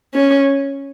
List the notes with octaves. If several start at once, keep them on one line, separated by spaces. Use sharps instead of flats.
C#4